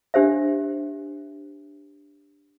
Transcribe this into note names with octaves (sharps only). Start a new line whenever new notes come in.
D4 G4 C5 E5